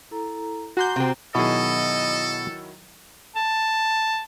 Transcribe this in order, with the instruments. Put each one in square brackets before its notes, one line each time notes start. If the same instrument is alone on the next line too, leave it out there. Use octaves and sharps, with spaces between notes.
[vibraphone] E4 A4 A#5
[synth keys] F#4 C6 G6 [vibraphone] G#5 A#5 D6
[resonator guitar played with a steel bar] C3 C4 [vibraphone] A#5
[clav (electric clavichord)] B2 G#4 [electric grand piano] D#3 F#3 E4 [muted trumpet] A4 [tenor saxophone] D#5
[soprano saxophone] A5